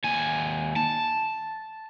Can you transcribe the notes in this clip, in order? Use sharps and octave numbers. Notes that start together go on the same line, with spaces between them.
D#2 G#5
A5